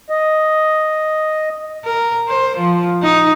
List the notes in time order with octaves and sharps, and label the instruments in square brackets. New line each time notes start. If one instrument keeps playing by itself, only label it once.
[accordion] D#5
[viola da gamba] A#4
C5
F3
D#4